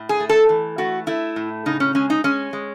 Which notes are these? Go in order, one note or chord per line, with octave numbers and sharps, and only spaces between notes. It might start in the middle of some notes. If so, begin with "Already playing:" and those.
Already playing: A2
G#4
A3
A4
E3
A3 F#4
A3 E4
A2
C#3 D#4
C#4
G#3 C#4
D#4
G#3 C#4
G#3